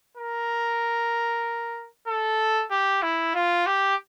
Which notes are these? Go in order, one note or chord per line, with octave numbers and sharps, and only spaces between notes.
A#4
A4
G4
E4
F4
G4